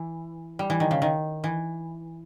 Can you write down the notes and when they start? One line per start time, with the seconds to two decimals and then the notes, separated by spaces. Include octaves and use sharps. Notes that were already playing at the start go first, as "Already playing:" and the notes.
Already playing: E3
0.59 G3
0.70 E3
0.80 D#3
0.91 C#3
1.02 D#3
1.44 E3